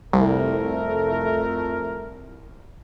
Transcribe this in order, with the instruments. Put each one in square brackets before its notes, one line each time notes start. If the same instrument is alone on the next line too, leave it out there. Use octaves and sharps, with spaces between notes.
[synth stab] C2 [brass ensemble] F2 A3 A#4